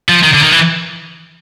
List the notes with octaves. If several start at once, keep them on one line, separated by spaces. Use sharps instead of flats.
F3
D#3
D3
D#3
E3